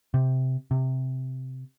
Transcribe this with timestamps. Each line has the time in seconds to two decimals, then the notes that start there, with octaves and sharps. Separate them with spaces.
0.14 C3
0.71 C3